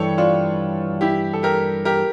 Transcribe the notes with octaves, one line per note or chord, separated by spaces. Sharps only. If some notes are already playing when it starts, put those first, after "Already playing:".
Already playing: G2 E3 G3 A4 C#5
D4 F4
E4 G4
A4
G4 A#4
G4 A#4